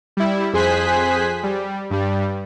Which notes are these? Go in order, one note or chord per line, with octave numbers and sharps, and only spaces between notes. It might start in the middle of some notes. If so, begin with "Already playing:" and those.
G3 E4
F2 G#4 C5 G#5 F#6 B6
G3
G2 G3